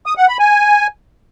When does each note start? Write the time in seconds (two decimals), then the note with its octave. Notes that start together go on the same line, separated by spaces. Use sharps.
0.06 D#6
0.17 F#5
0.28 B5
0.39 G#5